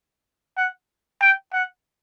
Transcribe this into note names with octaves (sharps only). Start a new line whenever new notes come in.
F#5
G5
F#5